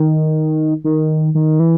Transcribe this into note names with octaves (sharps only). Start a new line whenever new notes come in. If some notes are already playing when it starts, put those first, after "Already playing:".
Already playing: D#3
D#3
D#3
E3